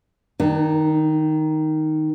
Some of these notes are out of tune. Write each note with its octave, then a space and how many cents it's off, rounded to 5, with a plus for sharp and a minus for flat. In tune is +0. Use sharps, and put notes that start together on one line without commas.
D#3 +0 D4 +40